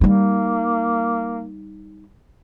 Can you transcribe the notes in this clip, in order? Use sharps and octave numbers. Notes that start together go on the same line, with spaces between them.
G3 A#3 D#4